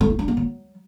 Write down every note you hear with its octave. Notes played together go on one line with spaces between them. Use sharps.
A3
E4
D4
A#3
F#3